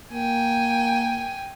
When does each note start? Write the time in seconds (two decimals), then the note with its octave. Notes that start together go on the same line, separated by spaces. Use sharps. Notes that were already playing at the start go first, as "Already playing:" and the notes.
0.13 A#3 G5 G#5